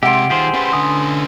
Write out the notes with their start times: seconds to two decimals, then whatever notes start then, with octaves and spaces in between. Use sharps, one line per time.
0.03 C3 G#3 G4 E5 F#5 C6 D7
0.30 D#3 F4 G4 G#4 C5
0.54 C#4 B4 C6
0.73 D3 G#5 D#6